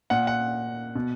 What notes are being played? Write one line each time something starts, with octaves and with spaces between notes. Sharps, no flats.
A#2 F#5
F#5
B2